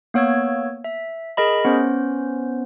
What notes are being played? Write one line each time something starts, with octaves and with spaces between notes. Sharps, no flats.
A#3 B3 C#5 E6 G#6
E5
G#4 A#4 D#5 B5
B3 C#4 C5